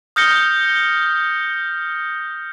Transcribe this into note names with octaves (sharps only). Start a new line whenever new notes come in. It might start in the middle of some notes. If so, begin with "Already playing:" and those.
D#6 F6 G6 A#6 C#7 G7